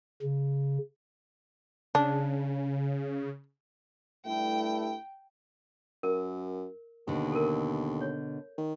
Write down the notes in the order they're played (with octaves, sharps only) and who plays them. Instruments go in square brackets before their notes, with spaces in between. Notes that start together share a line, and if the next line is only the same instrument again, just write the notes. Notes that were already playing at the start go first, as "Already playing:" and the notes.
[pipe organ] C#3
[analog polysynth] C#3 [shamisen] D4
[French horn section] G2 A3 E4 [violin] G5
[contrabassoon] F#2 [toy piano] A#4
[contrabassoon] D#2 [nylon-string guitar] B2 D3
[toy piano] A4 A#4
C#5
[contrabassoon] D#3